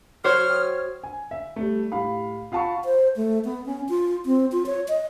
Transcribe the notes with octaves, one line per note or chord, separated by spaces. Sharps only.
F#3 C5 C#5 F6
E5 G5 D#6
G#5
E5
G3 A3
A2 G4 F5 B5
F4 F5 F#5 A5 B5 C#6
C5
A3
B3
C#4
F4
C4
F4
C#5
D#5